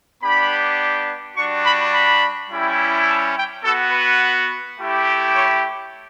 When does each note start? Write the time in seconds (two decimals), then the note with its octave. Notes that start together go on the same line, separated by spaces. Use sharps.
0.23 B3 D4 G4 B5
1.37 G3 D4 F#4 C#6
1.65 B5
1.94 B5
2.50 G3 C#4 E4 G4
3.08 A5
3.36 G5
3.64 B3 F#4 A4
3.92 B4
4.78 A3 E4 G4
5.35 C#5